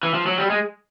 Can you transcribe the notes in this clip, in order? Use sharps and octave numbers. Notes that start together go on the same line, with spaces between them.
E3
F3
F#3
G3
G#3